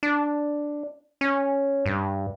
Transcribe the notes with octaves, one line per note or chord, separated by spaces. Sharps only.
D4
C#4
G2